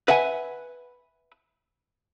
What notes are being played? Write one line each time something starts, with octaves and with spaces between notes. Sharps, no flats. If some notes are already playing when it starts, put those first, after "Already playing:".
B4 E5 F#5 G#5